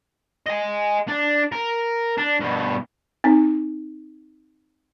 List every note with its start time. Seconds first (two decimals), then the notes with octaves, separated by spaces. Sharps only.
0.47 D#5 G#5
1.08 D4
1.52 A#4
2.18 D4
2.40 G2 B2
3.24 C4 D#4